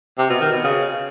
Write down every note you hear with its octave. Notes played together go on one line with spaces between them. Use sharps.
C3
B2
D#3
B2
C#3